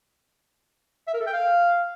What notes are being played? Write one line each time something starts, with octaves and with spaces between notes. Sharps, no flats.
E5
A#4
A4
G5
F5